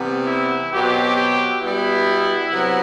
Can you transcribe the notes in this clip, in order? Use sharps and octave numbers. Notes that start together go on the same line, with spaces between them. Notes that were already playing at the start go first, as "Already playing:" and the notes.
Already playing: C3 E3 G3 B3
E4
B2 F#3 C4 G4
G4
B2 G3 B3 E4
C3 F#3 B3